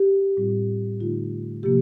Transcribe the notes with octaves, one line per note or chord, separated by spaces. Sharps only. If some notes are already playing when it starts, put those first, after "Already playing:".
Already playing: G4
A2 G3 C4 F4
D3 A3 D#4 F4
C3 F3 A#3 G4